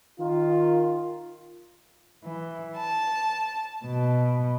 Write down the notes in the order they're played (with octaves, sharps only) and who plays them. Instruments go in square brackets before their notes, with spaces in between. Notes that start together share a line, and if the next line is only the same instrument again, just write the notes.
[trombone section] D#3 F4
[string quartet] E3
A5
B2